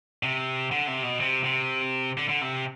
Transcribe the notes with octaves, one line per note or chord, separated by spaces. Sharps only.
C3
D3
C3
B2
C3
C3
D3
D3
C3